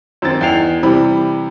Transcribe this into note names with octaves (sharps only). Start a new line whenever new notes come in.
F#2 D#3 C4 A6
E2 D#4 G5 C7 F7
C3 E3 G3 C4 B5